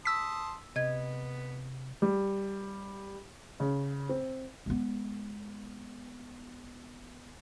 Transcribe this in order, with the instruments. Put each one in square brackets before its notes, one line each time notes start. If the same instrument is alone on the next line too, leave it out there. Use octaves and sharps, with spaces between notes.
[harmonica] A5 C6 D#6 [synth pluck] E6 B6
[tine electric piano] C3 [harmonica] B3 [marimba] D#5 G#6
[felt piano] G3
C#3
C4
[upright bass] G#3 B3